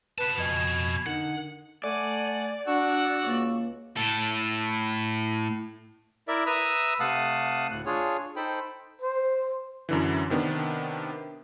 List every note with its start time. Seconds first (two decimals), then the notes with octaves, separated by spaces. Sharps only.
0.18 B2 B4 A5
0.38 F2 D#5 G#5 G#6
1.06 D3 D#4 A#4 F#5
1.84 A3 D5 F#5 G#5
2.67 D4 F#4 F#5 C#6 E6
3.24 C#2 A#3
3.97 A2 A4
6.28 E4 A#4 D5 E5
6.47 B4 E5 A#5 D#6 E6
7.00 C3 A3 F5 F#5 A5 D#6
7.71 D2 A2 F#6
7.86 D4 F4 G#4 C#5
8.36 D#4 A4 C5 G5 B5
9.02 C5
9.89 F#2 D3 E3
10.30 C3 D#3 B3 D4